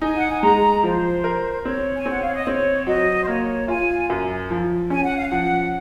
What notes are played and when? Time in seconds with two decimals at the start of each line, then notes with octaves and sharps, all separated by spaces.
0.01 D#4 G#5
0.16 F#5
0.29 G#5
0.42 G#3 A#5
0.83 F3 C5
1.24 A#4
1.65 C4 C#5
1.97 G#5
2.06 C4 F#5
2.22 F5
2.34 D#5
2.46 C4 C#5
2.87 F#3 D#5
3.23 C5
3.27 A#3 C#5
3.68 F4 G#5
4.10 F#2
4.51 F3
4.90 C#4 G#5
5.03 F#5
5.16 F5
5.28 F3 F#5